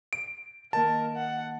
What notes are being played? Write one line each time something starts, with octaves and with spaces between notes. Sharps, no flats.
D7
D#3 A#3 A#4 A5
F#5